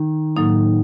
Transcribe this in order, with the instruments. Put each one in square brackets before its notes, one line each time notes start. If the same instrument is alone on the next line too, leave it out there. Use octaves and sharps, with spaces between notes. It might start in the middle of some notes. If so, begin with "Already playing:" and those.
Already playing: [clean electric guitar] D#3
[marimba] A2 F#3 A#3 D#4